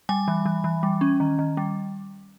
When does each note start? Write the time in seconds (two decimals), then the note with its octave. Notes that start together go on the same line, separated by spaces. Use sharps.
0.09 G3 G#5
0.28 E3
0.46 E3
0.64 E3
0.83 G3
1.01 C#4
1.20 D#3
1.39 D#3
1.57 G3